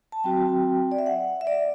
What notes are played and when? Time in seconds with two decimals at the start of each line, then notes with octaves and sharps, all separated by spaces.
0.12 A5
0.24 F#3 C4 F#4 G5
0.92 D5
0.99 E5
1.06 F#5
1.41 E5
1.47 D5